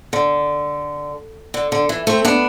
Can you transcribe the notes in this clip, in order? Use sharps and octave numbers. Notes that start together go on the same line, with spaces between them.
D3
D3
D3
E3
A3 C4
B3 D4